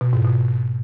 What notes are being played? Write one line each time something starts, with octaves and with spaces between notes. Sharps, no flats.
B2
G#2
B2